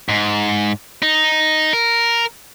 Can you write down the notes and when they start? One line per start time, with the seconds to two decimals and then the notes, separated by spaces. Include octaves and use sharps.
0.09 G#2
1.02 D#4
1.73 A#4